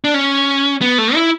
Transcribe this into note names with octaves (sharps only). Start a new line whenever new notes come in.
D4
C#4
B3
A3
E4